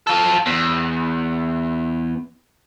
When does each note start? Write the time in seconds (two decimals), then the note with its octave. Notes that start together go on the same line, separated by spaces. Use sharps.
0.07 F4 A4
0.46 E2